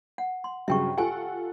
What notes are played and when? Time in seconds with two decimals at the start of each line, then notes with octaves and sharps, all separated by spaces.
0.18 F#5
0.44 C6
0.68 G2 C#3 F#3 E5 G5 C#6
0.98 F4 G4 A4 F#5 G#5